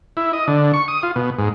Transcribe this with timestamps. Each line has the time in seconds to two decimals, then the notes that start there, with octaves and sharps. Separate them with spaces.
0.17 E4
0.33 D#5
0.47 D3
0.74 C#6
0.88 D#6
1.03 F4
1.16 B2
1.39 G#2